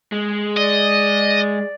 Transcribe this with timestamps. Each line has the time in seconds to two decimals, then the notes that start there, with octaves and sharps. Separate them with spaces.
0.12 G#3
0.57 D5 D#5